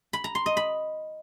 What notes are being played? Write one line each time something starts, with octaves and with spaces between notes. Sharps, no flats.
B5
A#5
C6
D#5
B5